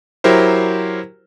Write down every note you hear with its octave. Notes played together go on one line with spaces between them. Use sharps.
F#3 E4 G4 A#4 C5